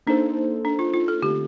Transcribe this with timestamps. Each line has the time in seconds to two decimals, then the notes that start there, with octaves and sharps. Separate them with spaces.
0.07 A#3 D4 D#4 A4 C5
0.65 D4
0.79 F4
0.94 F4
1.08 A4
1.22 D3 A3 C4 G4